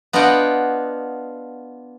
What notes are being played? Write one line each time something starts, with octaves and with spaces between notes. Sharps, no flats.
B3 D4 F4 D#5 F#5 G5